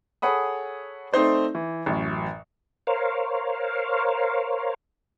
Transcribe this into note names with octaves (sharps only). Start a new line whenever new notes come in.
G#4 A4 C#5 F#5 B5 D#6
A3 C4 D#4 C5 D5
E3
A1 F#2
A#4 C5 C#5 F5